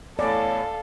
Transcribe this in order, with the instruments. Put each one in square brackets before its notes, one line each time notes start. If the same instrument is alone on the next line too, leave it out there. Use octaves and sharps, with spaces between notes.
[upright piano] E2 A2 [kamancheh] A4 F5 [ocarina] C#5 [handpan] D5